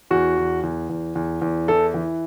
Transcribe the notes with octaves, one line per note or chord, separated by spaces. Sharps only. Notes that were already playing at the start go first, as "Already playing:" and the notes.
E2 F#4
E2
E2
E2
E2
E2
E3 A4
E3